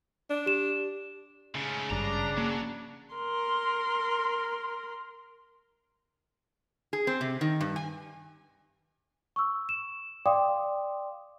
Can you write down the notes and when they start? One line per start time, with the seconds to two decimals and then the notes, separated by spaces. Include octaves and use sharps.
0.30 D4
0.46 G4 E7
1.55 G#2 C#3 A3
1.91 G#1 G2 D4 A#5
2.37 F#3 A#3
3.14 A#4 C6
6.93 G#4
7.07 C4
7.21 C3
7.41 D#3
7.61 G2
7.76 G#5
9.36 C#6 E6
9.69 E7
10.26 D5 F5 G5 C6 D6 D#6